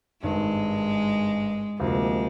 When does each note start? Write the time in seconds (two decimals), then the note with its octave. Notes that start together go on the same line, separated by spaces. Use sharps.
0.23 G#1 G2 D#3 G#3
1.79 D2 C3 F3 G#3 A#3